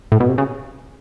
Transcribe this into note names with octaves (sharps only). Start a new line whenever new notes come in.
A2
B2
C3
C#3